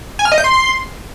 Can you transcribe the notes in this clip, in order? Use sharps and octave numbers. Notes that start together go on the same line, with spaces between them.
G#5
F6
D#5
G6
C6